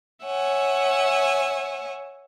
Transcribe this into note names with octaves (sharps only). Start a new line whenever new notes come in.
C#5 E5 F#5 G#5